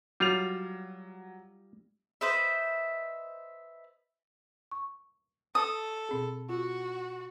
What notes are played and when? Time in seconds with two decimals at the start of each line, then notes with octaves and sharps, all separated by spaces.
0.20 F#3 G3 F4 F7
2.21 B4 C5 D#5 E5
4.72 C#6
5.55 A4 D#6
6.09 B2 C4 G#4
6.49 F4 F#4